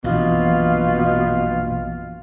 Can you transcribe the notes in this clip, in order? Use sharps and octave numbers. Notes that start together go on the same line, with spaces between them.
A#1 F#2 B2 E3 F4